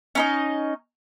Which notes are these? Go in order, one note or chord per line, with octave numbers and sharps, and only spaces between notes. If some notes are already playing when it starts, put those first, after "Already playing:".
C#4 D#4 D#5